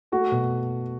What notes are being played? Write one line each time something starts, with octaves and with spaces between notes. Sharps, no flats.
A3 F#4
B2